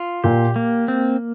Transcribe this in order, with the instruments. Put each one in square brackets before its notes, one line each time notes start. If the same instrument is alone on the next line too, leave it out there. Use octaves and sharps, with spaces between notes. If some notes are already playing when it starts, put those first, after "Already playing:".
Already playing: [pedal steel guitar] F4
[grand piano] A#2 [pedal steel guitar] G4
[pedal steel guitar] A#3
C4